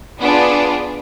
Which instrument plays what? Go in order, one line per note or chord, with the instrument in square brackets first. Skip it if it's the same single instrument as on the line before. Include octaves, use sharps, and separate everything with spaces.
[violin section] B3 D4 F4 G#4